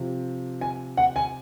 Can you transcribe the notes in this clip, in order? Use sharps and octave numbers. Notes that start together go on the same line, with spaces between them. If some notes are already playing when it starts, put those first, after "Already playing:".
Already playing: C3 F3
G#5
F#5
G#5